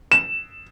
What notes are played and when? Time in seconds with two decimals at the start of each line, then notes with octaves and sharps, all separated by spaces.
0.12 E7